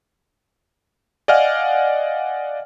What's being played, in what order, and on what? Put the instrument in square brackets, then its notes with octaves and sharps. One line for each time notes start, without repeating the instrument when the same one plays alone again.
[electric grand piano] D5 D#5 F5 F#5 G#5 F6